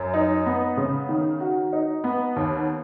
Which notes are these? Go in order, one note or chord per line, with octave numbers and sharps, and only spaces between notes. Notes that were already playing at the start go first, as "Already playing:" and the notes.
Already playing: F#2
D#4
B3
C#3
D#3
F#4
D#4
B3
D#2